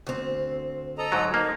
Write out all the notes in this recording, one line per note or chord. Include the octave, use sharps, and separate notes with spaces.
D2 C4
A4 D#5 A#5
G#2 F#3
A#3 D#4